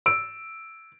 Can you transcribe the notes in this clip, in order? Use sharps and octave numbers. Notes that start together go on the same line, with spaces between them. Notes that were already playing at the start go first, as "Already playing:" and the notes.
E6 D7